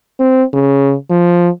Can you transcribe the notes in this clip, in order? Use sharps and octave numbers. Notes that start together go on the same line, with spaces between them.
C4
C#3
F3